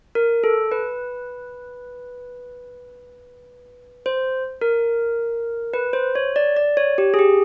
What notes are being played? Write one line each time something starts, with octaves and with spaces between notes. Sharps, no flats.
A#4
A4
B4
C5
A#4
B4
C5
C#5
D5
D5
C#5
G4
G#4
G4